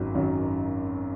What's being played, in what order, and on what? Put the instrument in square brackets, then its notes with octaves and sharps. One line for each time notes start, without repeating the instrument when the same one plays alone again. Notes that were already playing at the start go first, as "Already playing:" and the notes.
Already playing: [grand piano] G#1 F#2 D#3 F#3
G#1 F#2 D#3 F#3